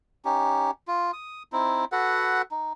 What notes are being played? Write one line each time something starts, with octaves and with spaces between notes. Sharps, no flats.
C#4 D#4 G4
F4
D#6
C4 D#4 E4
F#4 A4 B4 F#5
D#4